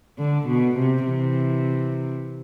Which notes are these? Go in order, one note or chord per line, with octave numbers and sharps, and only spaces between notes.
D3
B2
C3
C3 E3